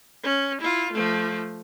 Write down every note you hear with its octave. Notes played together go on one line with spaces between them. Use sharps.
C#4
E4 F4
F3 A3